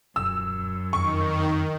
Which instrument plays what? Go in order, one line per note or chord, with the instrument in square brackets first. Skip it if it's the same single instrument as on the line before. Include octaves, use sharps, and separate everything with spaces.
[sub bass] D#1 [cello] F#2 [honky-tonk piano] E6
[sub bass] F2 [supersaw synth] D#3 [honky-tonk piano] C#6